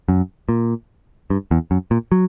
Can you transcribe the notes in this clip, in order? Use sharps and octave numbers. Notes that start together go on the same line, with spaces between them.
F#2
A#2
G2
E2
F#2
A#2
F#3